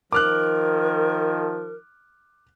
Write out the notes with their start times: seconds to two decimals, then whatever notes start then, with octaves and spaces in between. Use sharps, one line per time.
0.13 D#3 F3 A#4 D6 F6 F#6